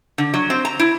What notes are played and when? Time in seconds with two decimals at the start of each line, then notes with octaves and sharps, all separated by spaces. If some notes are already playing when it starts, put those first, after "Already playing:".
0.18 D3
0.34 F#3
0.50 C4
0.65 A#5
0.79 E4